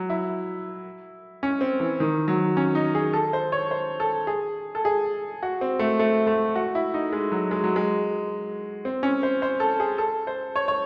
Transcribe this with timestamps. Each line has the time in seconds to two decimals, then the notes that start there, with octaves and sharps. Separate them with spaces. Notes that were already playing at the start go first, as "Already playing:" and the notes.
Already playing: F#3
0.09 E4
1.43 C#4
1.61 C4
1.80 E3
2.00 D#3
2.28 F#3
2.57 C#4
2.75 D#4
2.95 G#4
3.13 A4
3.33 C5
3.52 C#5
3.71 C5
4.00 A4
4.27 G#4
4.75 A4
4.85 G#4
5.43 F#4
5.61 C4
5.79 A3
5.99 A3
6.27 A3
6.56 F#4
6.75 E4
6.94 D#4
7.13 G#3
7.32 F#3
7.51 G#3
7.64 F#3
7.76 G#3
8.85 C4
9.03 C#4
9.23 C5
9.42 C5
9.60 A4
9.80 G#4
9.98 A4
10.27 C5
10.56 C#5
10.68 C#5